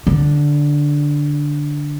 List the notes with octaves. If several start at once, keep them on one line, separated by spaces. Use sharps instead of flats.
D3